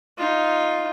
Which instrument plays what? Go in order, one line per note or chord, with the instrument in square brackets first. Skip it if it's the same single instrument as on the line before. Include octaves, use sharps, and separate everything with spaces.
[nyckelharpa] D#4 F4